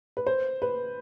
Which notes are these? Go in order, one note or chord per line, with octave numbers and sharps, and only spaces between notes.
B4
C5
B4